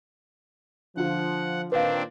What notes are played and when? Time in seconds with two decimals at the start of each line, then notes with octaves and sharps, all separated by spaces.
0.97 D3 F3 F4 F#5
1.72 A#2 D#3 C4 D4 B4 F5